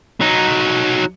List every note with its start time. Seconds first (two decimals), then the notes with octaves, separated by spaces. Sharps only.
0.21 F#3 D#4